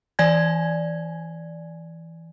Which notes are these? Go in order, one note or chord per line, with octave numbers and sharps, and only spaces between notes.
E3 D5 G#5 G#6